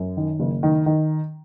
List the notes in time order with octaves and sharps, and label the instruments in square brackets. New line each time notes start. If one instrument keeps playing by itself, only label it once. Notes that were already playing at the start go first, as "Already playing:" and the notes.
Already playing: [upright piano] F#2
D#3
F#1
D#3
D#3